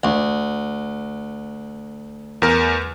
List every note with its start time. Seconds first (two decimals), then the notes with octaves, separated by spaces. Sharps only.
0.04 D2
2.42 E2 A#4